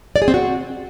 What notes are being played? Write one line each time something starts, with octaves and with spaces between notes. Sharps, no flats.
D5
G#4
C4
F#4